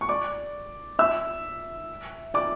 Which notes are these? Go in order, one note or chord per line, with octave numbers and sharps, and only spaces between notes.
C#6
D5 D6
E5 E6
D5 D6